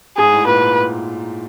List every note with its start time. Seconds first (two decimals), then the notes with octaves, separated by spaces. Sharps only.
0.17 G#2 G#4
0.32 A2
0.47 A#2 B4